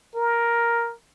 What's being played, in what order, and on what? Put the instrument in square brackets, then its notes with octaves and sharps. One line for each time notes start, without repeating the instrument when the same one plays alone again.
[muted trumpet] A#4